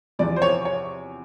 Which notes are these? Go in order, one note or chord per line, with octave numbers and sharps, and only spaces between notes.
E2 C3 F3 D5
C5
C#5
C#5